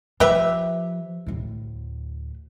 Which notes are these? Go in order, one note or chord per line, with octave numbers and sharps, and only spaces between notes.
F3 G4 B4 E5
D2 A2